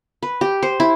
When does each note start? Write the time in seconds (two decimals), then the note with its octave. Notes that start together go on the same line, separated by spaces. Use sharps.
0.23 B4
0.41 G4
0.63 C5
0.80 E4